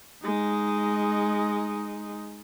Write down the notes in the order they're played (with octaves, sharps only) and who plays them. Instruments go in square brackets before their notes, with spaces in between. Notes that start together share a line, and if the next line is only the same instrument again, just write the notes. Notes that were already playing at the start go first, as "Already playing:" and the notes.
[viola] G#3 D#4